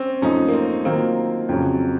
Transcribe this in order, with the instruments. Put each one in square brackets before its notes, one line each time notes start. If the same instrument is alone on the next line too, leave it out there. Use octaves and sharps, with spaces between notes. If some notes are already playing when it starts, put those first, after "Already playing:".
Already playing: [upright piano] C4 C#4
[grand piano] F#2 F3 A3 D#4 [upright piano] C#4
[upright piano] A#3
C4
[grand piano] D#3 F#3 A#3 F4 [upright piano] C4
[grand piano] F2 C#3 F#3